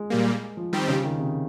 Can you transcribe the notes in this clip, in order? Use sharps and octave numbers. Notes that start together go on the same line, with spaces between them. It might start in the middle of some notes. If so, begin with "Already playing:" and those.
Already playing: G#3
A#2 G3 A#3
F3
D#3 G3 C4 G4
C#3
D#3
C3